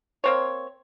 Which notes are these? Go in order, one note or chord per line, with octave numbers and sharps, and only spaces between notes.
A#3 C4 C#5